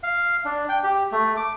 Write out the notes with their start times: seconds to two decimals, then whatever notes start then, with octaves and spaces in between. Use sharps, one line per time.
0.03 F5
0.45 D4
0.69 G5
0.84 G4
1.12 A3
1.37 D6